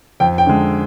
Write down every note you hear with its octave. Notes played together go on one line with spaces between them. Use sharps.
F2 G5
G5
D3 G#3